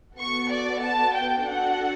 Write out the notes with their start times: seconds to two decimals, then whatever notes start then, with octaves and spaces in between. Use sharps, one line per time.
0.19 B3 F#4 A4 C#6
0.51 D5
0.82 A5
1.15 G5
1.47 D4 F#4 A4 F#5